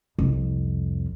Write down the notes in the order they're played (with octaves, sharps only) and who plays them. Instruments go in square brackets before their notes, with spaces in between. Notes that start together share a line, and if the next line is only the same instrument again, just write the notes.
[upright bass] C2 F2